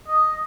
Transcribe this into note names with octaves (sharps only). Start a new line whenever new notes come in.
D#5